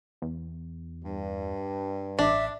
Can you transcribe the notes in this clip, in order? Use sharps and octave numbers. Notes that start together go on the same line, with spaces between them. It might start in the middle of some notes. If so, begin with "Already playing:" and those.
E2
G2
A1 D4 E5